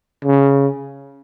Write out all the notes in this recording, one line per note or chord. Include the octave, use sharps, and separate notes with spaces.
C#3